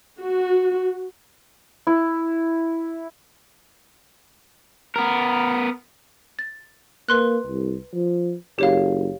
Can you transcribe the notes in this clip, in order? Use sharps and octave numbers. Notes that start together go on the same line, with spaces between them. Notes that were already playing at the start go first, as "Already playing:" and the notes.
F#4
E4
B3 A#4
A6
A#3 B4 C6 F#6
C2
F3
F#1 G4 C#5 F5